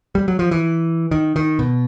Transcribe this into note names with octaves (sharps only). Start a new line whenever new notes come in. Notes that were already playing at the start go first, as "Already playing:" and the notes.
G3
F#3
F3
E3
D#3
D#3
B2